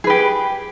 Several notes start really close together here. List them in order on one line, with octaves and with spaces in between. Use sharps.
G#4 B4 G4